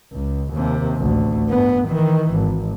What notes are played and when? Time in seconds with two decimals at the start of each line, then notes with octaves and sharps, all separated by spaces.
0.12 C#2
0.53 D#2 C3
0.98 A1 D2
1.49 G2 B3
1.88 D#3 E3
2.33 G#1